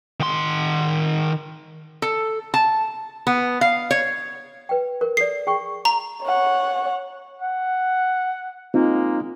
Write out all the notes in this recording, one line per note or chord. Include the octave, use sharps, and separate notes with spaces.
D#3 C6
A4
A5
B3
F5
C#5
B4 G5
A#4
A4 D5 C7
G#4 G5 C#6
A#5
C#5 F#5
F#5
G#3 A#3 C4 D#4 F4